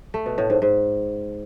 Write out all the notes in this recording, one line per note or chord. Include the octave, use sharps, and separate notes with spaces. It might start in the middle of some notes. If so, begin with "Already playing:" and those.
A3
B2
A2
G#2
G#2